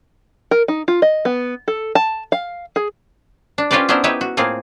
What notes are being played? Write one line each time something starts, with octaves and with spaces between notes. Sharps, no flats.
A#4
D#4
F4
D#5
B3
A4
A5
F5
G#4
D4
C#4 F4 G4 B4 C5 D5
B3 C#4 D4 E4 A#4 C5
D#4 E4 G4 B4 C#5 E5
F#4
A2 A#3 C4 F4 G#4